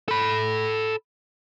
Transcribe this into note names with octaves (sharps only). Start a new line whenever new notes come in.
A4 B5